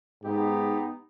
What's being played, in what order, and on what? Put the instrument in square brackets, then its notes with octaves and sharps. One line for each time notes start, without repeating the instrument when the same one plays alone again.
[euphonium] G#2 [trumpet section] B3 D#4 G4